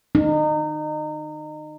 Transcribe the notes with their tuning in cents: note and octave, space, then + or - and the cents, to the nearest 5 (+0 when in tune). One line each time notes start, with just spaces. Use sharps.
D#4 -30